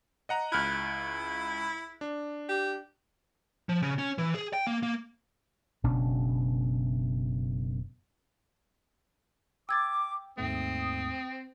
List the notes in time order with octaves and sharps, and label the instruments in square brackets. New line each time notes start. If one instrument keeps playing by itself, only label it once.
[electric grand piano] D#5 F#5 A#5
[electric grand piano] C#2 F6 F#6 [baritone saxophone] E4
[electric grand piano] D4
[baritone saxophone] G4
[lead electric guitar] F3
C#3
C#4
E3
G#4
G5
A#3
A#3
[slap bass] F#1 B2 C#4 D4
[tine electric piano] G5 [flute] D6 [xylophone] E6 G#6 A6
[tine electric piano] D#2 G#2 A3 [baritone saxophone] C4 [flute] D#6